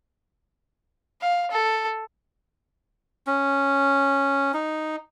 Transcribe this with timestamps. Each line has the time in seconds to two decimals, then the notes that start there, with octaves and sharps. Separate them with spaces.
1.22 F5
1.51 A4
3.27 C#4
4.54 D#4